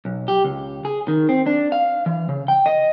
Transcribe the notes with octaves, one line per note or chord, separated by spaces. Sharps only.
B1
G4
C#2
G#4
D#3
C4
D4
F5
E3
C#3
G5
D#5